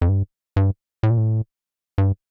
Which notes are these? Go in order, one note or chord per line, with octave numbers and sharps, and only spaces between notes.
F2
G2
G2
A2
A#2
A2
G2